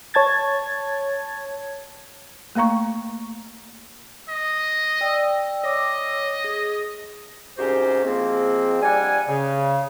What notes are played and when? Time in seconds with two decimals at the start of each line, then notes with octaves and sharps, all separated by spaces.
0.14 C#5 A5 G#6 A6
2.55 A3 A#3 F5 A#5 C#6
4.29 D#5
5.01 D5 G5 E6
5.64 C#5 D#5 D6 E6
6.44 G#4
7.58 C2 G#2 C#4 F#4 G4 C5
8.05 F3 G#3 A#3 C4
8.82 G3 D4 F#5 G#5
9.29 C#3